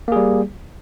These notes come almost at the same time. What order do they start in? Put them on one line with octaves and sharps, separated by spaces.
A#3 G#4 G3